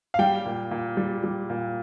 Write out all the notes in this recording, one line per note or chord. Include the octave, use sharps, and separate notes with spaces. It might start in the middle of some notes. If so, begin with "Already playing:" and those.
F5
G3 G5
A#2
A#2
G3
G3
A#2